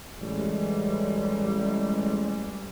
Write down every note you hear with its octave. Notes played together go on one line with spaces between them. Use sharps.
A1 G3 G#3